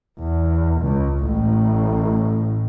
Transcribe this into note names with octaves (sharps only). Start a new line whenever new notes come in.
E2
C#2
A1 A2